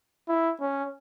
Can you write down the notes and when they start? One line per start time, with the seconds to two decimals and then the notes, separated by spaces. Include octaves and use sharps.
0.28 E4
0.61 C#4